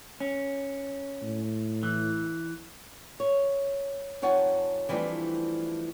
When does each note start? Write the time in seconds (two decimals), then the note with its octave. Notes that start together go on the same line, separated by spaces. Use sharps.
0.20 C#4
1.22 A2
1.83 E3
3.20 C#5
4.22 F2 D#4 C#5 F#5 G#5 A5
4.89 E3 F3 G3 A3 C4 D4